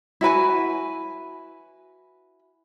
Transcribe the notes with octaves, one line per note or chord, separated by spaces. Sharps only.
E4 F#4 B4 G#5